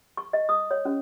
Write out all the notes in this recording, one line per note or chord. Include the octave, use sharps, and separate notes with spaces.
C#6
D#5
D#6
C#5
C#4